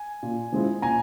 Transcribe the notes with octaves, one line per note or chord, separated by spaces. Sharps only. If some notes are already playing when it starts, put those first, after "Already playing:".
Already playing: G#5
A#2
F3 G#3 C4 E4
A#2 G#5 A#5